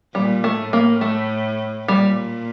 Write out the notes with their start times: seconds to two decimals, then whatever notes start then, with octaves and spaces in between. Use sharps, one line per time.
0.15 A#2 G3
0.44 A3
0.59 A2
0.73 A#3
1.01 A3
1.88 A#2 G3